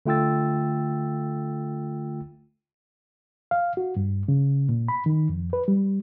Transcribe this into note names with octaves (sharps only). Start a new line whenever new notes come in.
D3 A3 F4 G5 E6 A6
F5
F#4
G2
C#3
A#2
B5
D#3
F2
B4
G3